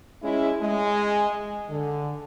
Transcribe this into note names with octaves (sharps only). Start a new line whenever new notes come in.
G#3 C#4 E4
G#3
D3